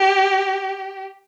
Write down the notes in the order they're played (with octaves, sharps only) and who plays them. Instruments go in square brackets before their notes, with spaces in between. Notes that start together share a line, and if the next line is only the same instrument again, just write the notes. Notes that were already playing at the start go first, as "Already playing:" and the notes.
Already playing: [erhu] G4